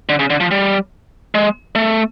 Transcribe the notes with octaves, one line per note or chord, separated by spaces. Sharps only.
D3
C#3
D3
F3
G3
G#3
A3